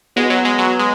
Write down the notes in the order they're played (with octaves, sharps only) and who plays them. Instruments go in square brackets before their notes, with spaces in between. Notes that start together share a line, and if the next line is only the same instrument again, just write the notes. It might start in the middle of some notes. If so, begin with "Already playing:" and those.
[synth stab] G#3 [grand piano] B3 F#4 B4
[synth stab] F#3
G#3
F#3
G#3